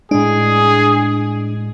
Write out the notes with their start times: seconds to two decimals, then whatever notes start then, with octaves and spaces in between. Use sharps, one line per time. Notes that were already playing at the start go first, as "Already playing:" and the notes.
0.11 A2 G#3 D4 G#4